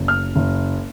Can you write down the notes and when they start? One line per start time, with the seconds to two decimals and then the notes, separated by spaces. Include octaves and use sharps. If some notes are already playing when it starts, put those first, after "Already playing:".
Already playing: F#1
0.08 F6
0.36 F#1